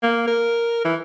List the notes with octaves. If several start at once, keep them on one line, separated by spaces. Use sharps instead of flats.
A#3
A#4
E3